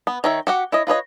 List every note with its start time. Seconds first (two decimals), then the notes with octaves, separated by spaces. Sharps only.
0.07 B3
0.24 D#3 C#5 E5
0.47 F#4 G4 F#5
0.72 E4 C#5 D#5
0.87 F4 B4 C#5 D#5